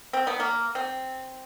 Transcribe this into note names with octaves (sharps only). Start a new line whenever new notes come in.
C4
B3
A#3
C4